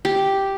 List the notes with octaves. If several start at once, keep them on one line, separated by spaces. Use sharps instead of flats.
G4